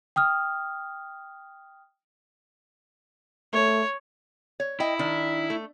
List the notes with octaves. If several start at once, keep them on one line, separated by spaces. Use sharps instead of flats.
G5 D#6 F6
A3 C#5
C#5
E4 D#5 G5
D#3 D4
A3